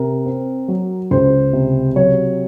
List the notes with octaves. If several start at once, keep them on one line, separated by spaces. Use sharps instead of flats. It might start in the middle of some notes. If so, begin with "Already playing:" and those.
Already playing: C3 A#4
C4
F#3
C#2 C5
C3
F#3 C#5